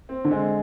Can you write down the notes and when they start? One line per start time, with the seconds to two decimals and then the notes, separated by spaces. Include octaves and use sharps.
0.09 C4
0.25 D3
0.31 G#3